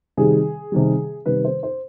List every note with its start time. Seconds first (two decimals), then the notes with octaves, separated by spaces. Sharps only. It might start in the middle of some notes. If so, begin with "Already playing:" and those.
0.17 C3 D#3 G3 G#4
0.72 C3 D#3 G3
1.26 C3 D#3 G3 B4
1.44 C5
1.63 C5